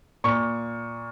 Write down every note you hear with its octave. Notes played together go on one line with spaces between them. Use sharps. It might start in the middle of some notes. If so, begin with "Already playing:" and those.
A#2 C#6